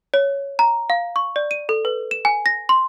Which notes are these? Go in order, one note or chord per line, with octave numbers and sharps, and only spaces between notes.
C#5
A#5
F5
C#6
D5
D#7
A4
B4
E7
G#5
A#6
C6